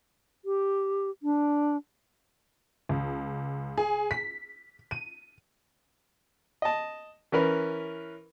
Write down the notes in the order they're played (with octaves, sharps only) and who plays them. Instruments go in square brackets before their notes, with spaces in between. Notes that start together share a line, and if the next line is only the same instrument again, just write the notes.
[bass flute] G4
D4
[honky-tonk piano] C#2
G#4
B6
D#7
[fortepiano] D#5 A5
E3 C#4 A#4 B4